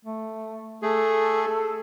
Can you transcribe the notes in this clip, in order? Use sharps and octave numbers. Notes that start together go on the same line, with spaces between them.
A3
A3 G#4 A4